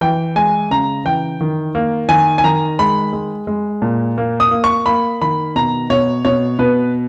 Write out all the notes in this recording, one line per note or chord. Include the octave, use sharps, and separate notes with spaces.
E3 G5
G#3 G#5
C#3 A#5
E3 G5
D#3
A#3
D#3 G#5
G#5
D#3 A#5
G#3 B5
G#3
G#3
A#2
A#3
D#6
A#3
C#6
A#3 B5
D#3 B5
B2 A#5
B2 C#5
B2 C#5
B2 B4